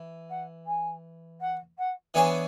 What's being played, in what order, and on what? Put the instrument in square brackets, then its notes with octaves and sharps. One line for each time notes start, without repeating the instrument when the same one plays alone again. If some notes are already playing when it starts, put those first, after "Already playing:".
Already playing: [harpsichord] E3
[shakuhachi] F#5
G#5
F#5
F#5
[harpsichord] E3 B3 D4 G#4 C#5 [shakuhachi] G#5